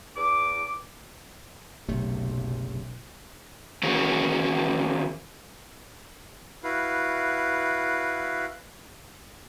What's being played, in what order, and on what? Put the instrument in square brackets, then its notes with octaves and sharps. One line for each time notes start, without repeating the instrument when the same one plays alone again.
[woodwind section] E2 D6
[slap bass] F#1 C3 A3 [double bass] B1
[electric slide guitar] D#3 E3 C#4 F#4 G#4 C#5
[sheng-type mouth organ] E4 F#4 B4 F5